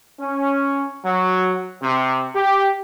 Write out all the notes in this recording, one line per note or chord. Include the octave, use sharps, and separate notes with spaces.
C#4
F#3
C3
G4